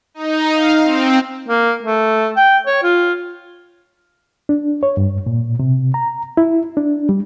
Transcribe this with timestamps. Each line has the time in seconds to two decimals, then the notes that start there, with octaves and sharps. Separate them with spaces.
0.14 D#4
0.53 F5
0.83 C4
1.49 A#3
1.83 A3
2.36 G5
2.67 C#5
2.83 F4
4.49 D4
4.83 C#5
4.97 G2
5.26 A#2
5.60 C3
5.94 A#5
6.37 E4
6.77 D4
7.09 G3